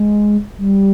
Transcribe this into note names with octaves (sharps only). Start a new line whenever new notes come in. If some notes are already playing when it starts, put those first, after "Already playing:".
Already playing: G#3
G3